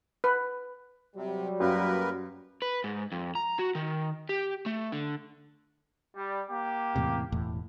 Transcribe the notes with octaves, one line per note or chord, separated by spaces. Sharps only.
B4
C3 F#3 G3
F#2 A#3 A#4 B4
B4
G#2
F2
A#5
F#4
D#3
G4
A3
D3
G3
A#3 G4
E2 A2 C3
E1 E2 A2